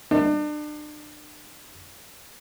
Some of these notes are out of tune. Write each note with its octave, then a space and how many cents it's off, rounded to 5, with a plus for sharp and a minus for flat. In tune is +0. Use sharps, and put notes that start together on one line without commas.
D4 +35